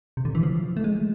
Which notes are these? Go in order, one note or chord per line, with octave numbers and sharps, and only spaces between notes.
C3
D3
E3
F3
A3
G#3